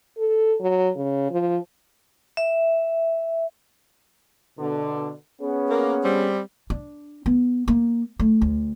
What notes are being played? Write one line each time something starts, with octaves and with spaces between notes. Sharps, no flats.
A4
F#3
C#3
F3
E5
B2 D3
B3 C#4 G#4
A#3
G3 C4
D4
B3
A#3
A3
D2